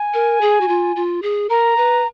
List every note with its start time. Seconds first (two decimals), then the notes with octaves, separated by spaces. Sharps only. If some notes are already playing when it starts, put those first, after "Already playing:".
Already playing: G#5
0.14 A#4
0.41 G#4
0.61 F#4
0.68 F4
0.96 F4
1.22 G#4
1.50 A#4 A#5
1.77 B4